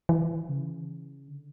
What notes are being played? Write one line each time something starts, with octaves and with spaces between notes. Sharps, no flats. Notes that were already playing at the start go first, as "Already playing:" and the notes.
E3
C#3
D3